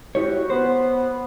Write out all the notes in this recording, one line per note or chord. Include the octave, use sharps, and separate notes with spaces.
E4 F#4 G4 C#5
B3 B4 C5